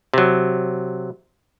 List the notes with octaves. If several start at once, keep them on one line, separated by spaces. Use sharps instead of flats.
C3 F#3